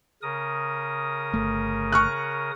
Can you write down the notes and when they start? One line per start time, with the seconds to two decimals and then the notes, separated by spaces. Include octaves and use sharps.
0.22 C#3 A#4 D#6
1.33 G1 A3
1.92 C#6 F6 F#6